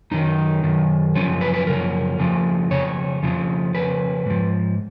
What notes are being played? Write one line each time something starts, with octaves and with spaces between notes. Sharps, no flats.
F#2 D#3 D#4
F#2 D#3
F#2 C#3 F3 C#4
B4
B4
F#2 C#3 F3 A#4
F2 C#3 F3
F2 C#3 C#5
F2 C#3 F3
F2 C#3 B4
G#2 F3